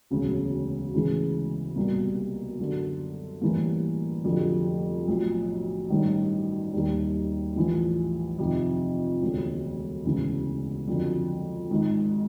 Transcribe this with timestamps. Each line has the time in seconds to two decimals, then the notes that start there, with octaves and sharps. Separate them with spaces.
0.11 E1 D2 C#3 F#3
0.93 D2 C#3 E3 G#3
1.76 C2 B2 G3 A#3
2.60 F#2 D3 F#3
3.41 A1 G2 E3 G3 A#3
4.25 F1 F2 D3 F#3 A3
5.07 B1 A2 F3
5.90 A1 G2 D#3
6.73 D#2 D#3 G3
7.56 A#1 A2 E3
8.39 F2 C3 D#3
9.22 E1 D2 D3
10.05 E1 D2 C#3 E3
10.88 F2 D3 F#3
11.70 G#1 G#2 D#3